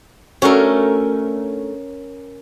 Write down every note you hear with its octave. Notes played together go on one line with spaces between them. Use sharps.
A3 C#4 D4 F#4 A#4